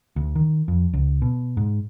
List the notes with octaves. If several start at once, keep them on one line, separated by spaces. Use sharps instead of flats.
D2
D#3
F2
C#2
B2
G#2